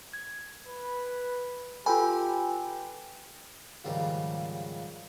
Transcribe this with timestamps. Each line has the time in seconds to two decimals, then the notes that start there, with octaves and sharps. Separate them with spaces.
0.13 G#6
0.67 B4
1.86 F4 G4 A4 B4 G5 G#5 B5
3.85 D#2 G#2 C#3 F3 G3